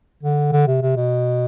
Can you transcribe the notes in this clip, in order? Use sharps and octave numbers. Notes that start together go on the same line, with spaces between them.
D3
D3
C3
C3
B2